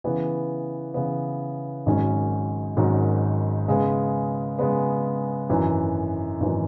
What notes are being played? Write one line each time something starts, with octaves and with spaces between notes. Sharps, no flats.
C#3 E3 B3
C#3 E3 B3
G#1 G#2 D#3 F#3 C#4
G#1 G#2 D#3 F#3 C#4
C#3 G#3 B3
C#3 G#3 B3
G#1 F#2 E3
G#1 F#2 E3